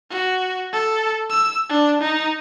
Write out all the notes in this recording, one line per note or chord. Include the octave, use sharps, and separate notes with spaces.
F#4
A4
E6
D4
D#4